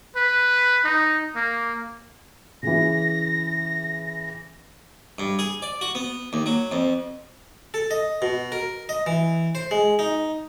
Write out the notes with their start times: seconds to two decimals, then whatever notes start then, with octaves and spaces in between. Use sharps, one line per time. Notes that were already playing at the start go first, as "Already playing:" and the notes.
0.16 B4
0.85 D#4
1.36 A#3
2.63 C#3 E3 A#6
5.19 G2
5.39 G#4
5.62 D5
5.81 F#4
5.95 B3
6.33 D#2
6.46 F#3
6.72 F2
7.74 A4
7.91 D#5
8.22 B2
8.52 A#4
8.89 D#5
9.06 E3
9.55 C5
9.71 G#3
9.99 D#4